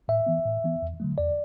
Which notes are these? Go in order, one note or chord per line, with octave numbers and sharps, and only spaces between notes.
A2 E5
E3 B3
A2
E3 B3
E2
D3 F#3 A3
E2 D5